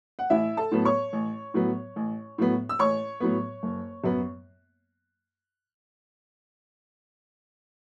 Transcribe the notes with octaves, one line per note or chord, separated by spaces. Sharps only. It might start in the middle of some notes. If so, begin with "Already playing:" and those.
F#5
A1 E4 E5
A4 A5
A2 F#3 B3
C#5 C#6
A1
A2 F#3 B3
A1
A2 F#3 B3
E6
A1 C#5 C#6
A2 F#3 B3
F#1
F#2 F#3 B3